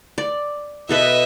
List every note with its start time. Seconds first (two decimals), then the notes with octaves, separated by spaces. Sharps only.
0.18 D5
0.89 B2 A4 B4 D#5 E5